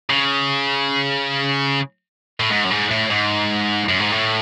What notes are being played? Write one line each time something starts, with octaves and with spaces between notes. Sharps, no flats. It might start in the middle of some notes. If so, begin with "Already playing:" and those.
C#3
A2
G#2
F#2
G#2
A2
G#2
F#2
G#2
A2